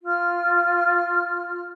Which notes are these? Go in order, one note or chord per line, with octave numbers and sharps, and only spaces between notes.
F4 F6